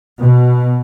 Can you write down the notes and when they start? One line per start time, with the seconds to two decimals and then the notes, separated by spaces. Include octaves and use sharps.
0.21 B2